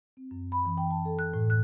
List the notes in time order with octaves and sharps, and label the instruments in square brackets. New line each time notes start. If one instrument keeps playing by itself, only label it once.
[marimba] C4
F#2
B5
E3
G5
A5
A4
F#6
A2
F#6